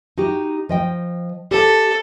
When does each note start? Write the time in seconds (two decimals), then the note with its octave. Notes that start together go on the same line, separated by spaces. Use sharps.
0.18 D#4 F#4 G4
0.69 F3 D#5 G5
1.51 G4 A4